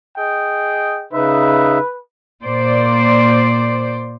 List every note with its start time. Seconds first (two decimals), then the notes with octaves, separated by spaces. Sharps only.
0.17 G#4 D#5 G5
1.13 C#3 D#4 B4 E5
2.42 A#2 C5 D5